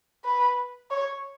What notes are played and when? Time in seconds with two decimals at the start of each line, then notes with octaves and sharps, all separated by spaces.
0.24 B4
0.91 C#5